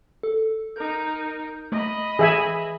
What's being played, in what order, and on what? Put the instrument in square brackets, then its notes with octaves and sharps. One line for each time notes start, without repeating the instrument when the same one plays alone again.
[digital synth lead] A4
[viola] D#4 A#4 [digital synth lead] G6
[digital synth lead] A3 [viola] D#5 B5
[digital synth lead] E3 [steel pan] G#4 E5 G#5